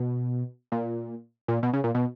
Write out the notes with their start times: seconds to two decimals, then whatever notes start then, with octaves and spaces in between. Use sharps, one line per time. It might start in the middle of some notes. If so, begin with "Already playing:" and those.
Already playing: B2
0.72 A#2
1.48 A#2
1.63 B2
1.73 C#3
1.84 A#2
1.95 B2